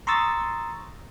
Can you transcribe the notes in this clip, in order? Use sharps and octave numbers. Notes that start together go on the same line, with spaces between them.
A#5 C6 C#6 D#6 E6 A6